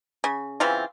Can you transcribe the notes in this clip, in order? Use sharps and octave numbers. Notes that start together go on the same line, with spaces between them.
C#3
C#3 E3 C4 F4